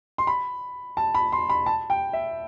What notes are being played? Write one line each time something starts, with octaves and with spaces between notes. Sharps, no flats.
C6
B5
A5
B5
C6
B5
A5
G5
E5